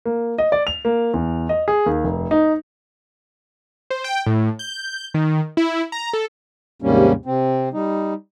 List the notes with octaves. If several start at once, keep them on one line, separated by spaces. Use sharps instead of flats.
A#3
D#5
D5
F7
A#3
E2
D#5
G#4
D#2
F1
D#4
C5
G5
A2
G6
D#3
E4
A#5
A4
D#2 G#2 C3 G3 A#3 C#4
C3 C4
G3 D#4